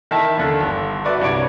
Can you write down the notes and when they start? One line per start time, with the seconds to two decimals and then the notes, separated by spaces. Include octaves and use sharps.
0.11 D#3 E4 E5 A5 B6
0.37 D#2 D3
0.60 G1
1.05 F#4 B4 D5 E5
1.20 C2 G2 C#5 D7